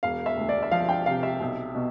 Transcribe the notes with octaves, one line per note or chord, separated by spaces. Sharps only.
E1 F5
E5
D2
D5
E5
F3 F5
G5
C3 F5
E5
B1
B2